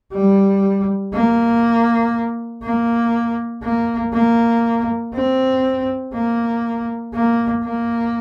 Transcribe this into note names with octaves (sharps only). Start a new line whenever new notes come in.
G3
A#3
A#3
A#3
A#3
C4
A#3
A#3
A#3